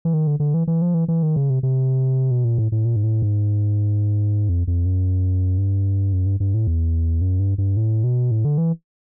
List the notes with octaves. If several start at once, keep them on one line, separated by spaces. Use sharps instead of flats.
E3
D#3
D3
D3
E3
E3
F3
E3
E3
D#3
C#3
C3
C3
B2
A#2
A2
A2
A#2
G#2
A2
G#2
F2
F2
F#2
G2
F#2
G2
G2
A2
E2
F#2
G2
G2
A2
B2
A2
D3
E3